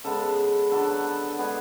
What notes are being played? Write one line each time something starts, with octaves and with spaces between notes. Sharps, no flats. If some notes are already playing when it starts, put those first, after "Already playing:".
C#3 G#3 B3 A4
D3 F#3 B3 A4
D3 G#3 B3 G#4